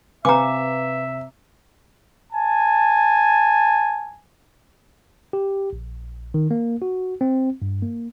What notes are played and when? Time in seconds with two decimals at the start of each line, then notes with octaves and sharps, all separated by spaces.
0.25 C3 B4 E5 F5 G#5 A#5 D6
2.33 G#5 A5
5.33 G4
5.73 A#1
6.34 D#3
6.51 A#3
6.82 F#4
7.21 C4
7.62 G2
7.82 A#3